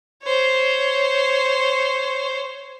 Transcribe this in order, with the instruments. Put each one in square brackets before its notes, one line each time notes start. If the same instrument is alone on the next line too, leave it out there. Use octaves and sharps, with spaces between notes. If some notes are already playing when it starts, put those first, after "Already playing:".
[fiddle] C5 C#5